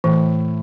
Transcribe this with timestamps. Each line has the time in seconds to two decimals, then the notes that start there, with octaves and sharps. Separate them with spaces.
0.04 A2 E3